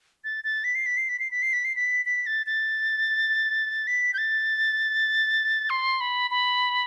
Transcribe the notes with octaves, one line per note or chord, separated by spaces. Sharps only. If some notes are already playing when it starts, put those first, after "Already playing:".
A6
A6
B6
C7
B6
C7
B6
C7
B6
C7
B6
C7
B6
B6
A6
A6
B6
G6
A6
C6
B5
B5